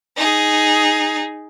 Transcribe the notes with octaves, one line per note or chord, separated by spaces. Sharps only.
D#4 G#4